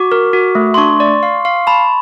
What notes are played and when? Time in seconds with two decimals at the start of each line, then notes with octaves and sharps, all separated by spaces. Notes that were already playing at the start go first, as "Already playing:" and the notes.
Already playing: F#4 D6
0.12 A#4
0.33 F#4
0.55 A3
0.74 C6
0.78 D4 C#6
1.00 D5
1.23 F5
1.45 F5
1.67 A5 B5